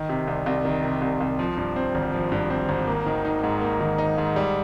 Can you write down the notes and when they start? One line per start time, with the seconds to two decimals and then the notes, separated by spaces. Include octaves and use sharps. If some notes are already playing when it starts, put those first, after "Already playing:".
Already playing: D#3
0.09 C3
0.27 C2
0.46 C2
0.65 D#3
0.83 C3
1.02 C2
1.20 C2
1.39 F3
1.57 G2
1.76 C4
1.95 G#1
2.13 F3
2.32 G2
2.50 C4
2.69 G#1
2.87 A#3
3.06 D#3
3.25 D#4
3.43 G#2
3.61 A#3
3.80 D#3
3.98 D#4
4.18 G#2
4.36 G3